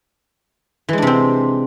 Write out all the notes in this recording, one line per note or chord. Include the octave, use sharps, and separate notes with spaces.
C3 E3 G#3 C4 D4